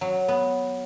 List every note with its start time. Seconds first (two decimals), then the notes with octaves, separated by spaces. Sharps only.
0.01 F#3
0.28 B3